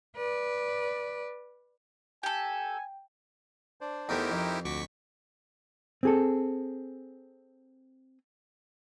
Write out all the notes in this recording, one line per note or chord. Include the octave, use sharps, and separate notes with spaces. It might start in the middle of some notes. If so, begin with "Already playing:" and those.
B4 D5
G4 A4 G5 G#5
D4 C5 D5
E2 A3 D#4 E4 G4 A#4 C5 G5
F2
D2 F#4 C#6 D6 B6
C4 G#4 A4